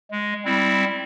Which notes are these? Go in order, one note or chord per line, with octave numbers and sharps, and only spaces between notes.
G#3
G3 C4 E4